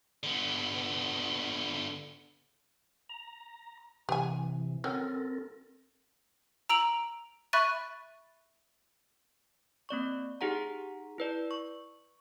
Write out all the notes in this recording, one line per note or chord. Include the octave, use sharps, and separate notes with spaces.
D3 B3
A#5
C3 E3 G4 G#5
F#3 C4 C#4 A4 A#4
A#5 E6 D7 F7 F#7
E5 B5 C#6 F#6 A6 D#7
A#3 C4 D5 C#6
D#4 G4 G#4 F#5 A#5
E4 B4 D5
C#6